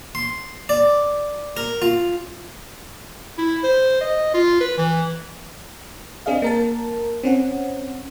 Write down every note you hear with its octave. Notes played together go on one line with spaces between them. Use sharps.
C6
D5
A#4
F4
E4
C5
D#5
F4
B4
E3
C4 D4 G#4 D#5 F5
A#3 A#4 A5
C4 C#4 F#5